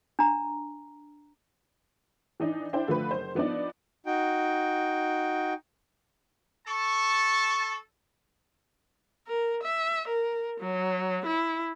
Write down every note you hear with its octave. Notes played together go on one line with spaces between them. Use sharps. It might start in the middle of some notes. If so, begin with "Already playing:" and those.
D4 A#5
E3 D4 D#4
D4 E4 C5 G5
D3 F3 A3 B4
F#1 C5
F3 B3 D4 D#4 D5
D#4 F#4 G5
A4 A5 C#6
A#4
E5
A#4
F#3
E4